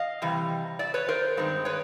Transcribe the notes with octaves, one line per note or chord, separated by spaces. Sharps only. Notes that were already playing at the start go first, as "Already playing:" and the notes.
Already playing: D#5 F5
C3 E3 G3
D5 E5
B4 C#5
A#4 C5
G2 D#3 G#3 C4
B4 C#5